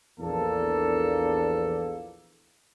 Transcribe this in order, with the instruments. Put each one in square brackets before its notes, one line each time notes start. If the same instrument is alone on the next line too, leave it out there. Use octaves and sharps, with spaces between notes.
[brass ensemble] A#1 E2 A#3 A4